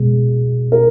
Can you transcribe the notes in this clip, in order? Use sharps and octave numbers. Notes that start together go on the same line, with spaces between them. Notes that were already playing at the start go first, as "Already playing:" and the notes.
Already playing: B2 G#3
A#4